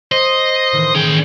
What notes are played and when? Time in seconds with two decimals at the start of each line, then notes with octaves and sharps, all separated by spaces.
0.12 C5 D#5
0.72 A2 D#3 E3
0.95 E3 C#4 G#4 G5